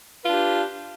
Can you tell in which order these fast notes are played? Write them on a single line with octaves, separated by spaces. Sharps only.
B4 F4 D4 G4